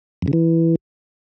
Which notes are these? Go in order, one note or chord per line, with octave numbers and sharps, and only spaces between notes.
F2
C#3
E3